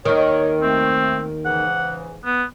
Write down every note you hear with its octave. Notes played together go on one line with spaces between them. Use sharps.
D#2 D#3 C#5
C3 A3 C4
G#2 C#3 E3 F#5
B3